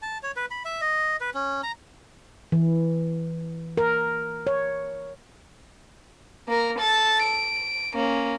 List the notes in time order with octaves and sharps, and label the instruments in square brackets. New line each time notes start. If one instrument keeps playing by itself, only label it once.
[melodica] A5
C#5
B4
B5
E5
D#5
B4
C#4
A#5
[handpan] E3
A#4
C#5
[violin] A#3 A#4
A4 A6
D7
A#3 C#4